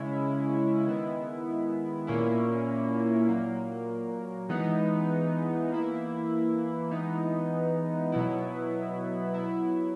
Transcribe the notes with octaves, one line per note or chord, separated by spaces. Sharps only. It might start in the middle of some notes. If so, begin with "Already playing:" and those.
Already playing: C#3 G#3 C#4 E4
D#3 G#3 B3 E4
A#2 A#3 C#4 E4
A#2 F#3 A#3
E3 G#3 B3 D#4
E3 A#3 E4
E3 G#3 B3 D#4
B2 F#3 B3 E4
F#3 B3 E4